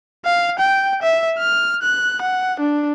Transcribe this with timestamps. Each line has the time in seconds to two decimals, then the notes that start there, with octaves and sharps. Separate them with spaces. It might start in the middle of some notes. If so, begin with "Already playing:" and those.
0.25 F5
0.59 G5
1.02 E5
1.38 F6
1.82 F#6
2.22 F#5
2.60 D4